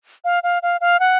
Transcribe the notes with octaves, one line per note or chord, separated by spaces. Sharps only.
F5
F5
F5
F5
F#5